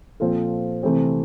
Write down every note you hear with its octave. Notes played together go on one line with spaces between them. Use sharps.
A#2 F3 C4 F4 A4
C3 E3 A3 C4 G4